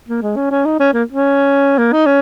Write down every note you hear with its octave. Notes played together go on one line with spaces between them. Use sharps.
A#3
G#3
C#4
C#4
D#4
C#4
A#3
C#4
A#3
D#4
C#4